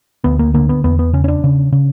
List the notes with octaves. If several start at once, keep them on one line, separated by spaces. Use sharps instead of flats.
D2 B3
A#3
D3 A#3
B3
E2 B3
B3
C#3 C#4
C#4
D4
C#3
C#3